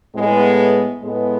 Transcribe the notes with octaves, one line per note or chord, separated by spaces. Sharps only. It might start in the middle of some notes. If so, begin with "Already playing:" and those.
A2 G#3 B3
A2 G#3 B3